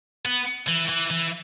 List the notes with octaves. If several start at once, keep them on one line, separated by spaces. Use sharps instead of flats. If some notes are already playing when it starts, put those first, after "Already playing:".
B3
E3
E3
E3